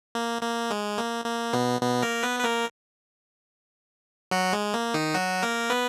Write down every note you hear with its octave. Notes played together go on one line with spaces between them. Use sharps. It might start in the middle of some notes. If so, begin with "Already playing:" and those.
A#3
A#3
G#3
A#3
A#3
B2 B3
B2 B3
A#3 A#4
B3 B4
B4
A#3 A#4
F#3 F#4
G#3
A#3
D#3 D#4
F#3 F#4
A#3 A#4
B3 B4